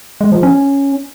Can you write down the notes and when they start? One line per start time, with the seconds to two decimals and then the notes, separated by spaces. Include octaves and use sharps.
0.21 G#3
0.32 F3
0.43 C#4